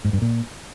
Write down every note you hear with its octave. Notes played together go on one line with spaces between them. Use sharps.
G#2
G2
A#2